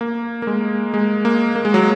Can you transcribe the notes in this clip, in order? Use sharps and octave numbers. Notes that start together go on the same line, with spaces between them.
A#3
A#3
G#3
G#3
A#3
A#3
G#3
F#3